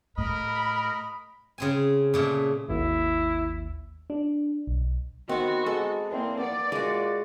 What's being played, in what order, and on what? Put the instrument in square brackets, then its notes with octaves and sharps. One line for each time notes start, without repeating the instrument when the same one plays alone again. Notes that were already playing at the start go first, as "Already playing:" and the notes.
[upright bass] A2 [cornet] A#4 [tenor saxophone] D#5 [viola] B5
[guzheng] C#3 C4 G#5
A#2 C#3 A3
[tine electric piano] G#1 D#2 [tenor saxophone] E4
[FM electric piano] D4
B1
[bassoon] D#3 [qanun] B3 C4 [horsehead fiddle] F#4
[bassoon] G#3 [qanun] A4
[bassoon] E2 [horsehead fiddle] A#3 C4
[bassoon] B3 [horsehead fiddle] D5
[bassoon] A#2 [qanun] G#3 F#4